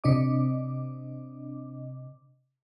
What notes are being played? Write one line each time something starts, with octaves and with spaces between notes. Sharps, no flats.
C3 D4 D#5 D6